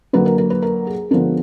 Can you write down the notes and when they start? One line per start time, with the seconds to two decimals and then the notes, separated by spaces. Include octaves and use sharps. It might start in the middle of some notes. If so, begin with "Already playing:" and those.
0.13 D3 F#3 A#3 B4
0.26 A#4
0.38 A#4
0.50 B4
0.62 A#4
0.87 G#4
1.11 D3 F3 G#3 B3 A#4